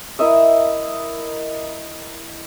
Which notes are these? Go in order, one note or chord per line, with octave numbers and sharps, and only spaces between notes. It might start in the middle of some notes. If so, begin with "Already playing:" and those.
E4 A#4 D#5 E5